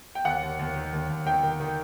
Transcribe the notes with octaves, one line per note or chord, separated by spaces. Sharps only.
G5
D#2 F#5
D#2
D#2
D#3
D#2
D#2
D#3 G5
D#3
D#3